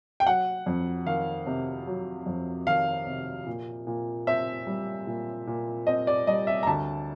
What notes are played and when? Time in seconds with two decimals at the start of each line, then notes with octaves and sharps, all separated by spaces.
0.20 G5
0.26 F#3 F#5
0.66 F2
1.06 D#3 F5
1.47 C3
1.87 F#3
2.26 F2
2.67 D#3 F5
3.07 C3
3.46 A#2
3.87 A#2
4.27 C4 E5
4.67 G3
5.07 A#2
5.47 A#2
5.87 C4 D#5
6.07 D5
6.27 G3 D#5
6.47 E5
6.63 A#5
6.67 D2 A5